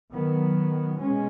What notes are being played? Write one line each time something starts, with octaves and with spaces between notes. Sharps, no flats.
D#3 F#3 B3
B2 G#3 C#4